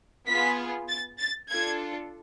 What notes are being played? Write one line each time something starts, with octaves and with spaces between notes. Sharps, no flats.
B3 F4 G#4 B6
A6
A6
D4 F4 A4 G#6